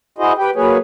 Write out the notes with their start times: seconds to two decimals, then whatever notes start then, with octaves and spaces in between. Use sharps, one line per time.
0.18 E4 F#4 G#4 C5 D#5
0.38 G4 B4 G5
0.55 F#3 A#3 G#4 B4 C#5